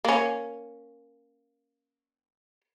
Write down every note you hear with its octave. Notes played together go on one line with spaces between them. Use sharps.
A#3 C#4